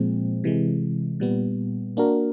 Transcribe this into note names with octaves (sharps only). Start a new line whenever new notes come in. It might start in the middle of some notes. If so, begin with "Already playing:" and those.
Already playing: A#2 F3 G#3 C4
C3 E3 G#3
A#2 G3 B3
A#3 D4 F#4 A#4